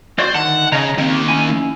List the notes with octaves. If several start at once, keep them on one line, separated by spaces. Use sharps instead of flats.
C4 F#4 C#5 D5
D3 D#3 F#5 A5
C#3 C#5 D#5 A#5
D#3 A#3 C4
C#4 E4 G#5